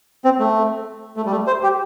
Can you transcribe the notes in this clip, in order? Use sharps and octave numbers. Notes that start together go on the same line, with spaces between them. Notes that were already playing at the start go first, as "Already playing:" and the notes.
C4
A3
A3
G3
A3
C5
G4